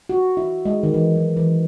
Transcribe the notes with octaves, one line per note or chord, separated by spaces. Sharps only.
F#4
E4
G#3
D#3
E3
F#3
E3